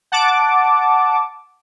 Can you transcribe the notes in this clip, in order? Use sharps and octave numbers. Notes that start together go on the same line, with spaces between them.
F#5 A5 D6